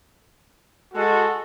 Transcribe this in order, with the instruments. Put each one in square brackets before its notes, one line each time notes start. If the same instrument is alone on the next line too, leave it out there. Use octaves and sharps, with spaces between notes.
[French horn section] G#3 [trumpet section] F#4 A4